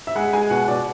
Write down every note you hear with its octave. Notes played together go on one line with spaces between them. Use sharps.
E5
G#3 F#5
G#3 G#5
B2 F#5
B2 D5